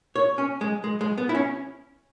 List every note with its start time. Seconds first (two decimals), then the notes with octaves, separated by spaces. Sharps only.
0.16 C#5
0.38 C#4
0.61 G#3
0.84 G#3
1.01 G#3
1.18 B3
1.29 E4
1.35 C#4